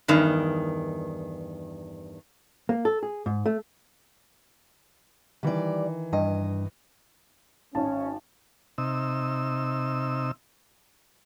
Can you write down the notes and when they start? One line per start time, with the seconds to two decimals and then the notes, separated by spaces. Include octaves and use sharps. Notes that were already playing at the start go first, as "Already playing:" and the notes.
0.08 E2 G2 D#3
2.69 A#3
2.85 A4
3.03 G#4
3.26 G#2
3.46 A3
5.43 D#3 E3 G3 D5
6.13 G2 D#5
7.75 G#1 C#4 A5
8.78 C3 D#4 E6